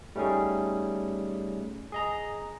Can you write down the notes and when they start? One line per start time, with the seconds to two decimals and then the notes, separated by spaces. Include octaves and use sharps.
0.16 G3 A3 C#4 D#4 G#4
1.92 G#4 D#5 A#5